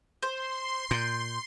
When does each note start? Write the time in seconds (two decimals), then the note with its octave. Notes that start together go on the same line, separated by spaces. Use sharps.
0.23 C5 C6
0.91 A#2 G6